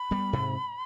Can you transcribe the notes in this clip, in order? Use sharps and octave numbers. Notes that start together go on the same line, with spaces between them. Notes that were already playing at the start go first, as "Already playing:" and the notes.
Already playing: B5
G3 B3
G#2 C3